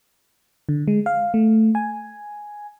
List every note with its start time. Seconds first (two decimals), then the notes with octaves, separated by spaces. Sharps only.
0.69 D3
0.88 G#3
1.06 F5
1.34 A3
1.75 G#5